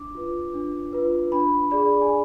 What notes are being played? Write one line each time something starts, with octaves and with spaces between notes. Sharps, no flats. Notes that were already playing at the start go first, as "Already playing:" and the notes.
Already playing: D4 D6
F4 B4
D4
F4 B4
D4 B5
G#4 D5 B5
G#5